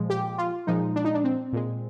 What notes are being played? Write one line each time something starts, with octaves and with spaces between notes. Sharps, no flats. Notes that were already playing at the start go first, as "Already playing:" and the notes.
Already playing: A#2 F3 G#3
G4
F4
A#2 F3 G#3 D#4
D4
D#4
D4
C4
A#2 G#3